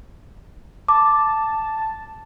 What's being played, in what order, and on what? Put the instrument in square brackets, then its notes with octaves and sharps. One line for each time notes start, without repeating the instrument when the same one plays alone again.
[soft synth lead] A5 [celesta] D6